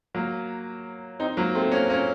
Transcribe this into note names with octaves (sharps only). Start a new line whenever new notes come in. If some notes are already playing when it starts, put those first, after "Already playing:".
F#3 A#3
C4 D#4
F#3 A#3
A3 C4
A#3 C#4
A#3 C#4